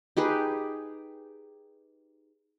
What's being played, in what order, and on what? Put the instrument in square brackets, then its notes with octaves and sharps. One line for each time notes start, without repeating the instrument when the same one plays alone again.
[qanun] D#4 G4 G#4 B4